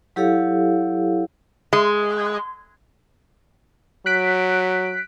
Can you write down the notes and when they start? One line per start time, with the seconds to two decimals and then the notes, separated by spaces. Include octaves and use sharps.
0.16 F#3 E4 G4 A4 C#5 F5
1.73 G#3
4.06 F#3 F#6 B6 D7